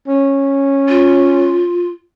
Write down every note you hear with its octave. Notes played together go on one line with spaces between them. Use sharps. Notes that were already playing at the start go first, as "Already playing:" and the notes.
C#4
F4